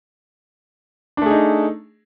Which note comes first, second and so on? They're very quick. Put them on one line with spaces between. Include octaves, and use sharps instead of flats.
D4 A3 G#4 D#4